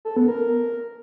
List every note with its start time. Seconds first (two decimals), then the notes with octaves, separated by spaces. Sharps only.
0.05 A4
0.16 B3
0.28 A#4